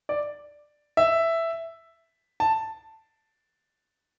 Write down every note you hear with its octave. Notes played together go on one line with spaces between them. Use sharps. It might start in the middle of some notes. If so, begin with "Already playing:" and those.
D5
E5
A5